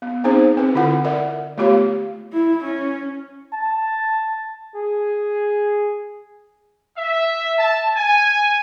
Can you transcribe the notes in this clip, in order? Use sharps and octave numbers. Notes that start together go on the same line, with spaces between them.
B3
B3 C4 D#4 G#4 C5
C4 B4
D3 E4 F4 F#5
A#4 D5 E5 F#5
A3 B3 F4 G4 C#5 F5
E4
C#4
A5
G#4
E5
A5
G#5